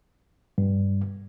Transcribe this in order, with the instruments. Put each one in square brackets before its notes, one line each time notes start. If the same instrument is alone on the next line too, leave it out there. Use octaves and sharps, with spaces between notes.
[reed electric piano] G2